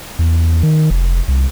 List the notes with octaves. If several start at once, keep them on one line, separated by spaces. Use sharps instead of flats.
E2
D#3
F1
C2